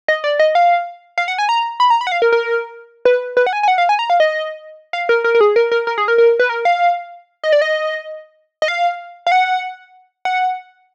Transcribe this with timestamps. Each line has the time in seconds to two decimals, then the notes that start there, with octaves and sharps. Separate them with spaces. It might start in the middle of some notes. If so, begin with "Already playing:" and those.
0.08 D#5
0.24 D5
0.39 D#5
0.55 F5
1.18 F5
1.28 F#5
1.38 G#5
1.49 A#5
1.80 B5
1.90 A#5
2.01 B5
2.07 F#5
2.12 F5
2.22 A#4
2.32 A#4
3.05 B4
3.37 B4
3.46 F#5
3.53 G#5
3.63 G#5
3.68 F#5
3.78 F5
3.89 G#5
3.99 A#5
4.10 F5
4.20 D#5
4.93 F5
5.09 A#4
5.24 A#4
5.35 A#4
5.41 G#4
5.56 A#4
5.72 A#4
5.87 A#4
5.98 G#4
6.08 A#4
6.18 A#4
6.39 B4
6.49 A#4
6.65 F5
7.44 D#5
7.53 D5
7.62 D#5
8.62 D#5
8.68 F5
9.27 F5
9.32 F#5
10.25 F#5